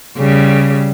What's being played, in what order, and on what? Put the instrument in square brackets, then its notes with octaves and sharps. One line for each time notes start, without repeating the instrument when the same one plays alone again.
[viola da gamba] C#3 G3